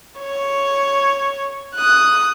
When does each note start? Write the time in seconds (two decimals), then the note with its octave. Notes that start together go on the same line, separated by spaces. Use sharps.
0.19 C#5
1.75 D#6 F#6